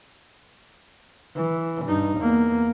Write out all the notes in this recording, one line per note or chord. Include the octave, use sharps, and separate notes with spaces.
E3
G2 D#4
E2 A#3